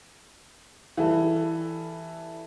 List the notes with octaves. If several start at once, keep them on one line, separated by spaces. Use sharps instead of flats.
E3 G3 A4